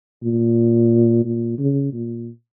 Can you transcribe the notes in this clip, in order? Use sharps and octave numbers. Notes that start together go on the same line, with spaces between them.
A#2
A#2
C#3
A#2